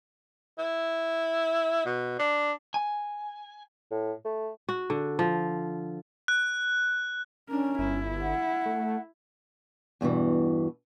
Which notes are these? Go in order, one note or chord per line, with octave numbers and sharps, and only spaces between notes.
E4
B2
D4
G#5
A2
A3
F#4
D3
F3
F#6
C#4 D4 A#4
G1 E4
F#5
A3
E2 G2 B2 E3